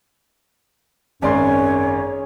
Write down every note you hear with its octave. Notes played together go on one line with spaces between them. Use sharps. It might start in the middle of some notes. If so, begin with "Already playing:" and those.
G#1 F#2 C#4 G#4 C#5 D5 G#5 C6